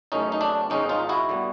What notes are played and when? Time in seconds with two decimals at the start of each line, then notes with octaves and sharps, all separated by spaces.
0.12 F#2 C#3 E3 A3 C#4 D#4
0.32 D#4
0.41 D4
0.70 G#2 D#3 G#3 C#4 D#4
0.89 D#4 F4
1.09 E4 F#4
1.29 D3 G3 B3